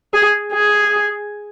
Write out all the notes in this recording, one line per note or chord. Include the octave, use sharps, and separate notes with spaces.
G#4
G#4